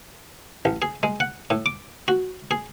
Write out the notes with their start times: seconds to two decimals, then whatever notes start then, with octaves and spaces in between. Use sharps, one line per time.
0.65 A1
0.82 G#4
1.03 G#3
1.20 F#5
1.50 A2
1.66 D6
2.08 F#4
2.51 G#4